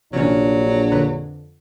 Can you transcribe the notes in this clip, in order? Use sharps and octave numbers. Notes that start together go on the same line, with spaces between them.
A#1 C3 E3 F#3 C#4 D4
F2 D3 B4